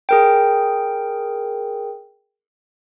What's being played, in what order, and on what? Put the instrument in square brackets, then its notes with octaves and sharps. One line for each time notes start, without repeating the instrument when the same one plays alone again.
[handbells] G#4 A#4 G5